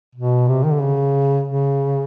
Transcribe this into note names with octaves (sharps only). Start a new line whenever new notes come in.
B2
C3
D#3
D3
C#3
C#3